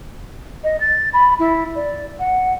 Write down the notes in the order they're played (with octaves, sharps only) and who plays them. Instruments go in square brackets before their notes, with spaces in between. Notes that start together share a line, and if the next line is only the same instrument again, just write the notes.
[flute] D#5
A6
B5
E4
D5
F#5